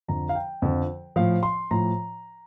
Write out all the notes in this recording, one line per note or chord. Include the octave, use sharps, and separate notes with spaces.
F2 D3 F3 A#5
F5
G5
F2 D3 F3
A2 F3 F5
C6
A2 F3 A#5